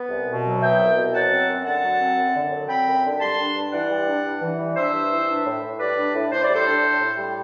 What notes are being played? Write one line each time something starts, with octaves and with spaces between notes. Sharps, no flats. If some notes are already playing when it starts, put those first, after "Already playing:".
Already playing: B3
C2
B2
F#3
B3 E5 G5
C2
B2
F#3 F#5 A5
C4
F#2
D3 F#5 A5
F#3
C4
F#2
D3
F#3
C4 G5 B5
F#2
D3
G3 A5 C6
D4
G2
E3 D5 F#5
G3
D4
G2
E3
G3
D4 C5 E5
G2
E3
D4
A2
A2
G3 B4 D5
D4
A2
A2 C5
D5
G3
A4 C5
D4
A2
A2
G3